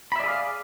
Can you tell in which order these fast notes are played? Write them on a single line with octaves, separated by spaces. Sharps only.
B5 E5 D5 G#4 F5